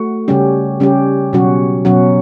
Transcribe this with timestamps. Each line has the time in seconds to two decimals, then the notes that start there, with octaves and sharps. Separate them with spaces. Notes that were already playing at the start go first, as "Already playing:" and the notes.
Already playing: A3 F#4
0.28 C#3 G3 C#4 G4
0.80 C#3 G3 C#4 G4
1.33 B2 F#3 C#4 F#4
1.85 B2 F#3 C#4 F#4